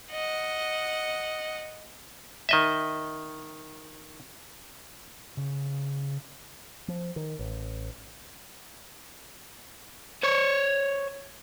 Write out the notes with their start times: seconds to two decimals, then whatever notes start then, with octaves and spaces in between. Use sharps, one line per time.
0.10 D#5 F#5
2.49 D#3 D#5 E5
5.37 C#3
6.88 F3
7.16 D#3
7.39 A1
10.23 C5 C#5